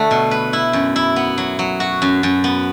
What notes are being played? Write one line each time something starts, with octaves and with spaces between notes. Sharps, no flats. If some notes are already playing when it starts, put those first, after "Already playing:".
Already playing: D3 A3 F#4
B2
B4
E4
F#2
E4
B3
F#3
F#3
F#4
F#2
F#2
B3